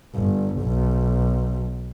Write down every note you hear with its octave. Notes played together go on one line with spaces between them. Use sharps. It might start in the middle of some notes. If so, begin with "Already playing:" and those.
G1
B1